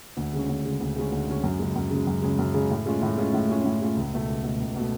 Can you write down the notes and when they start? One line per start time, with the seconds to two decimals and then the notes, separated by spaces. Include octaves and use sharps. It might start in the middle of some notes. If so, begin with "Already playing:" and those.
0.17 D2
0.33 C#3 G#3 C#4
0.49 D2
0.65 C#3 G#3 C#4
0.80 D2
0.96 C#3 G#3 C#4
1.12 D2
1.28 C#3 G#3 C#4
1.43 F#2
1.59 C#3 G#3
1.75 F#2
1.91 C#3 G#3
2.07 F#2
2.22 C#3 G#3
2.39 F#2
2.54 C#3 G#3
2.70 A2
2.86 G#3 C#4 F4
3.02 A2
3.18 G#3 C#4 F4
3.33 A2
3.49 G#3 C#4 F4
3.65 A2
3.81 G#3 C#4 F4
3.97 C#2
4.12 B2 A3
4.28 C#2
4.44 B2 A3
4.60 C#2
4.76 B2 A3